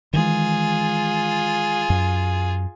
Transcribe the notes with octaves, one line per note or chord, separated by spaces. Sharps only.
D#3 E3 G#3 F4 G#4
F#2